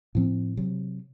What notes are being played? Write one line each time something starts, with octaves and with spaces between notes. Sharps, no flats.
A2 F3 C4
C3 F#3